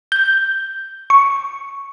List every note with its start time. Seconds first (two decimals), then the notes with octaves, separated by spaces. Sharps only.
0.12 G6
1.10 C#6